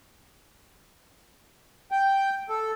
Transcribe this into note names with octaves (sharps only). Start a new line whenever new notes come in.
G5
A4